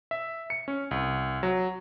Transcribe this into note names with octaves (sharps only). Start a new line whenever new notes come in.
E5
C#7
C#4
C2
F#3